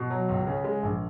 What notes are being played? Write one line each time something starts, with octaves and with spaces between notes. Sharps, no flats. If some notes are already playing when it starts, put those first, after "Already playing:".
Already playing: B2
F#3
C#2
C#3
G#3
A#1